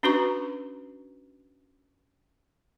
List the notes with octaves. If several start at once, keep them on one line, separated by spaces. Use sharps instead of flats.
C#4 D4 F#4 B4 A#5 C#6